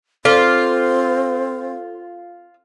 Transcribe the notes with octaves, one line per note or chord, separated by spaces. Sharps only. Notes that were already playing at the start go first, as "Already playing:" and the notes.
C4 F4 A4